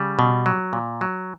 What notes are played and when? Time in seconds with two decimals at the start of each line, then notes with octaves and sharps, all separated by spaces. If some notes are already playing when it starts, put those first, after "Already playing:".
Already playing: C#3 G3
0.19 B2
0.46 F#3
0.73 A#2
1.01 F#3